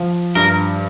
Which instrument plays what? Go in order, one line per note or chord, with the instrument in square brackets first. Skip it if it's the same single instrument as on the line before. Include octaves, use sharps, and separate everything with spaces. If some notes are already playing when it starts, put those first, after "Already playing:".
Already playing: [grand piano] F3
[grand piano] G2 [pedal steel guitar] A#4